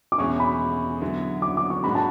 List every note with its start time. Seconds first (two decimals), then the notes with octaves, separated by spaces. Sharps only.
0.12 D6
0.18 E2 B2 G#3 C#4 E4 C#6
0.40 B5
1.01 D3 F#3 B3 E4
1.42 D6
1.57 D6
1.70 C#6
1.84 G#2 G#3 D4 F#4 B5
1.95 A5